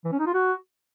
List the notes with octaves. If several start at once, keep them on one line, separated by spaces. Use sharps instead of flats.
E3
C#4
D#4
F4
F#4